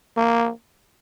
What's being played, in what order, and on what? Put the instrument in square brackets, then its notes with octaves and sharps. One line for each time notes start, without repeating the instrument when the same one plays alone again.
[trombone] A#3